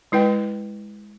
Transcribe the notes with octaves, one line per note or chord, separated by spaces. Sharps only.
G#3 E4 B4 G5